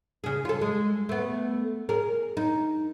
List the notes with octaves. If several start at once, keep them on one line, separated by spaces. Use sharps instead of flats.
C#3 G#4
F4 A4
G#3
A3 B3
G#4 A#4
D#4